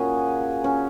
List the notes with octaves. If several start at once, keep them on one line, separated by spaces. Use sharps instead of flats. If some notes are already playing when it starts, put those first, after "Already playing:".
Already playing: A#2 A#3 C#4 F#4 G#4
C#4